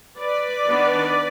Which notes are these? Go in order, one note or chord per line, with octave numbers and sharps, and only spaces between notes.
B4 D5
D#3 B3 D4